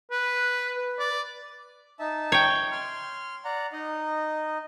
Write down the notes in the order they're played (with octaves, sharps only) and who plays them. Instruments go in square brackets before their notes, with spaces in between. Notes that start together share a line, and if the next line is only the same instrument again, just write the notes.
[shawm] B4 [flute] F#6
[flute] B4
[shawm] D5
[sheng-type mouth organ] D#4 E5 A5
[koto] C#5 G5
[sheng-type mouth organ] C6 F6
D5 F#5 A#5
D#4 D#5